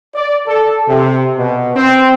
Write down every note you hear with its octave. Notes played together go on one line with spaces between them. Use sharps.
D5
A4
C3
B2
C4